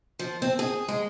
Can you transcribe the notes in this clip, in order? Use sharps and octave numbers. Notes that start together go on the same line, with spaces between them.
F3
C4
G#4
G#3